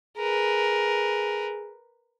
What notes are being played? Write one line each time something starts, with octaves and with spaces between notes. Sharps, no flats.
G#4 A#4 B4